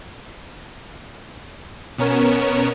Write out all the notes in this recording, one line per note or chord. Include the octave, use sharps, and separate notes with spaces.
B2 B3 C#4 A#4 C#5 E7